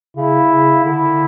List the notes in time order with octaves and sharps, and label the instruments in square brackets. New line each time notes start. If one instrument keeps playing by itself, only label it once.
[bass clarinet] C#3 [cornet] E4
[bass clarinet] C#3
[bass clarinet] D3 [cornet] E4